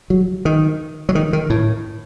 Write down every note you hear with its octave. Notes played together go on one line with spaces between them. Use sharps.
F#3
D#3
F#3
D#3
D#3
A2